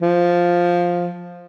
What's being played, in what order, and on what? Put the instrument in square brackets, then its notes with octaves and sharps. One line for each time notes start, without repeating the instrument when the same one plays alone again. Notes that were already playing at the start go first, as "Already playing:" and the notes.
[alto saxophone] F3